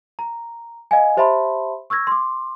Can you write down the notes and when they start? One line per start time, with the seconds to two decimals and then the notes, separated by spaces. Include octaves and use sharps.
0.19 A#5
0.91 D#5 F5 G#5
1.17 G4 C5 E5 A5 B5 C6
1.90 C#6 E6 F6 G#6 A#6
2.07 C6 D6